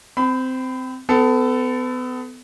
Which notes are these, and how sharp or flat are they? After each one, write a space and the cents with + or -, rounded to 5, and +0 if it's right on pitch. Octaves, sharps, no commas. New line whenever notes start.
C4 -15 B5 +30
B3 +35 A4 +0